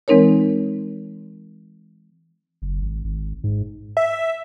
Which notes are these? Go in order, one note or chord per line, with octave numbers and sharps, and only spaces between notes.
E3 G#3 C4 D#4 A#4 C#5
F#1
G#1
G#1
G#2
E5